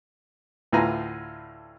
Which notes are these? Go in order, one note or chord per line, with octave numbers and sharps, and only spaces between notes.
D2 A2 F4 B4 G#5 A#5